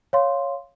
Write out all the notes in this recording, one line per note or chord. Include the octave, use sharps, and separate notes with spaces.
C#5 F5 C6